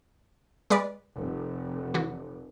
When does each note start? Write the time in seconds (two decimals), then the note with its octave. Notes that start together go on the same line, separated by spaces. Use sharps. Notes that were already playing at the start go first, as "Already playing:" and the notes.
0.70 G#3 B4 D5
1.14 F1
1.94 E3 F#4